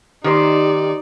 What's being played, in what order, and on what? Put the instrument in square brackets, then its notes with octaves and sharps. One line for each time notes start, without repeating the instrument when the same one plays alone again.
[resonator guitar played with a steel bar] D#3 A#3 C5 [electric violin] D#4 D5 [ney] G4